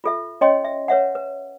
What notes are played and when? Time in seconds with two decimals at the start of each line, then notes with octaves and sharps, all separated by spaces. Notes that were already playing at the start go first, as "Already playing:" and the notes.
0.04 F4 A4 E5
0.41 C#4 C#5 D#5 G5 C6
0.65 E5
0.88 B4 C#5 E5 F#5
1.15 B4